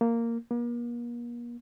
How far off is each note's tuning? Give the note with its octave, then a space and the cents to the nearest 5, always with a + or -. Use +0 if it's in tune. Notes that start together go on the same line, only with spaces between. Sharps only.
A#3 -10
A#3 +40